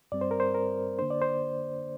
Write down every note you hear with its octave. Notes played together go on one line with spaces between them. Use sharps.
G2 G3 C4 D5
C5
A#4
C5
A#4
D3 A#3 D4 C5
D5
C5